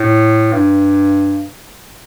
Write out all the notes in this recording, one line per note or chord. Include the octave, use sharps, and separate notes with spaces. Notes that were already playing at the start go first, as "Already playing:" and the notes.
Already playing: A2
G2